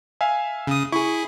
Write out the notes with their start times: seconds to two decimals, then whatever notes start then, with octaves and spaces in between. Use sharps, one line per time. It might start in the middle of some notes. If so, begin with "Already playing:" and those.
0.21 E5 F5 G#5
0.67 C#3 D#6
0.92 E4 G#4 C#6